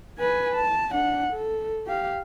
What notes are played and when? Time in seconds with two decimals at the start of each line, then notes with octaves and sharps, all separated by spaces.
0.18 B4 G#5
0.55 A5
0.91 D4 F#5
1.33 A4
1.87 G4 F5